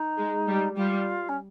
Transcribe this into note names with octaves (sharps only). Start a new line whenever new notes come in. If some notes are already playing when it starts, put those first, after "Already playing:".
Already playing: D#4
G#3
G3
G3 F4
C#4